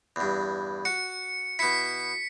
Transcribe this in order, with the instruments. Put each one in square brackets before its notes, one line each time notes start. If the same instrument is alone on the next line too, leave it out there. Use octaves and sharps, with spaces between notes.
[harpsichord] E2 G2
[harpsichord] F#4 [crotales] C#7
[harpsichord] B2 E4 [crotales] B6 C#7